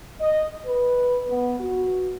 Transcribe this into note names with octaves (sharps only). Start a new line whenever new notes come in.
D#5
B4
B3
F#4